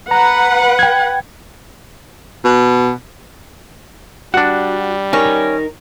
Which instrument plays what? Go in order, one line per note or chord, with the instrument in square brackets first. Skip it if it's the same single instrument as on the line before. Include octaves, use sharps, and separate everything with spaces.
[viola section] B4 F#5 [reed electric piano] A#5
[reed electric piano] G5 G#6
[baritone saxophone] B2
[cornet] G3 [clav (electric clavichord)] D4 F#5 [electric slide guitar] F#4
[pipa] C#4 [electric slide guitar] D#4 A#4